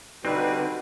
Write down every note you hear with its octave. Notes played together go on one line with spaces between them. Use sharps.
D3 G3 C4 D#4 F#4 B4